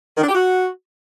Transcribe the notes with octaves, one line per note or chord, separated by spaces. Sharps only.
D#3
D4
G4
F#4